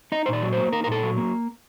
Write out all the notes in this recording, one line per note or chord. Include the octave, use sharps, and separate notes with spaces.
D#4 D#5
A#2 C5
D5
F#3
A#3 C5
D#4 A#4
A#4
A#2 A4
F#3
A#3